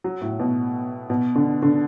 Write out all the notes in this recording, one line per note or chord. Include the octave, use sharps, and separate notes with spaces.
F#3
A2
B2
B2
D3
D3